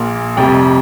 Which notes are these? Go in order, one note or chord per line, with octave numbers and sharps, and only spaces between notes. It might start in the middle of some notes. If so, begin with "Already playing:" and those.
Already playing: A#1 A#2 A#3 C6
F1 F2 C3 G3